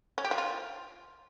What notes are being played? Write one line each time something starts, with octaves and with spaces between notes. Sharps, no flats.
C#4
G4
F3
F4